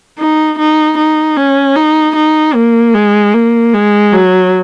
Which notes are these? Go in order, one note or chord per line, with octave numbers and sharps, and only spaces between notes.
D#4
D#4
D#4
C#4
D#4
D#4
A#3
G#3
A#3
G#3
F#3